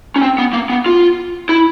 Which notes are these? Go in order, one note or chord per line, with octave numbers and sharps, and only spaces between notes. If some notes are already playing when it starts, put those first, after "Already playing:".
C#4
C4
B3
A#3
B3
F4
E4